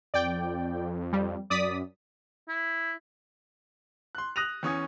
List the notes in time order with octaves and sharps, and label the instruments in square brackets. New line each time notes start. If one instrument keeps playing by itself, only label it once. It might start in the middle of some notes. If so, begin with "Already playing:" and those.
[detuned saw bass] F2 [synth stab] D5 G5
[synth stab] G3
[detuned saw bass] F#2 [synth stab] D5 D#6 B6
[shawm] E4
[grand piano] C6 F#6
D#6 F#6 A#6 D#7 F7
E2 C#4 C#6 D#6 G#6